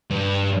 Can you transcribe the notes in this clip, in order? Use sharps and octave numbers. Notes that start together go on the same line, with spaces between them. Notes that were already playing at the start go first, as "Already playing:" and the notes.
G2